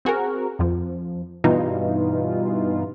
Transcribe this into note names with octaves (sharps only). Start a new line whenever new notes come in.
C4 F#4 G#4 A#4
F2 F3
G2 B2 E3 D#4 F4